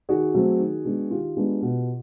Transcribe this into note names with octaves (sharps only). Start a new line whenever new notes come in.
D#3 F#4 G#4
F#3 A3 C4
D#3
G#3 B3 D4
D#3 F4 G4
G#3 B3 D4
B2